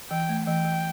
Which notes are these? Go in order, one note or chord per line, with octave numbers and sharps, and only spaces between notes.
E3 G5
A3
E3 G5
E3